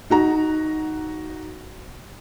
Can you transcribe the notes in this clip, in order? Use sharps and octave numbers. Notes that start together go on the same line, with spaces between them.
D#4 F#4 A#5